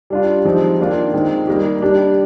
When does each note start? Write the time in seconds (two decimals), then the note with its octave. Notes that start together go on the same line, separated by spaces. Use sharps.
0.10 G3 D4 F4
0.45 F3 G#3 C4 D#4 G4
0.79 D#3 A#3 D4 F4
1.14 D#3 G#3 C4
1.47 G3 A#3 D#4 G4
1.82 G3 D4 G4